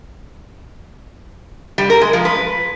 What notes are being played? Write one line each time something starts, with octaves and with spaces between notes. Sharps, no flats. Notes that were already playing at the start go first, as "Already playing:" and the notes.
G3
A#4
G#3
F3
B4